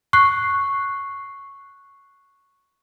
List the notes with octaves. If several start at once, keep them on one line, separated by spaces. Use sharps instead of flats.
C#6 F#6 C7